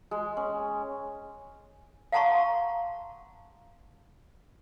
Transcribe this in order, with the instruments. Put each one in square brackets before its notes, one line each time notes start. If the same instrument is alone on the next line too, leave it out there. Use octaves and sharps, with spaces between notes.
[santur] G#3
C#4
[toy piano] F5 F#5 A5 A#5 C6 C#6